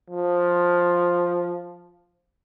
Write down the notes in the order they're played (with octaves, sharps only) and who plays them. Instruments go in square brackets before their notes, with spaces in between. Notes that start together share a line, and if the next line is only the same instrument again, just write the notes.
[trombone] F3